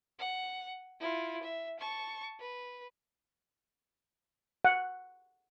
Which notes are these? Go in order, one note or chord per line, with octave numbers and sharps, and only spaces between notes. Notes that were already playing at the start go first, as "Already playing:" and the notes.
F#5
E4 F4
E5
A5 C#6
B4
F#5